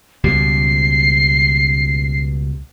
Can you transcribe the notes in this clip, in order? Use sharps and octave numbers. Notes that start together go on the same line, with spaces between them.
C#2 B2 G3 C7